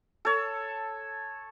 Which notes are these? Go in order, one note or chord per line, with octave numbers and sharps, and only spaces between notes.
A4 C#5